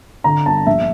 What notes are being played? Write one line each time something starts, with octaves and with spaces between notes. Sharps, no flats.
D3 A#5
G1 A5
A#1 E5